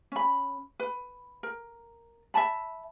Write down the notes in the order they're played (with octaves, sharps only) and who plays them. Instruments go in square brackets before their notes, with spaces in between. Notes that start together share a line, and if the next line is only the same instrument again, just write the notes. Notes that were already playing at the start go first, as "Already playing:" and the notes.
[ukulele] C#4 B5
B4
A#4
E5 G5 A5 B5